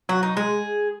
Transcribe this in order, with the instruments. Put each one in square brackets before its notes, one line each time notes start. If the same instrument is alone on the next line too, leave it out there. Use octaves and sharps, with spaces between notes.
[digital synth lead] F#3 [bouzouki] F#4
[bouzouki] D#4
[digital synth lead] G#3 [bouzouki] G#4